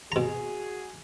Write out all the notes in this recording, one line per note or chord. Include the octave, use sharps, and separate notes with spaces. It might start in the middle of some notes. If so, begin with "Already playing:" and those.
B2 F#4 G#4 A#5